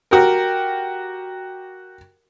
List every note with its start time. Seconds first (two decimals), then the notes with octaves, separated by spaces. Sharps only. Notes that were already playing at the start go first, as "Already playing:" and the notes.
0.11 F#4 G4 A#4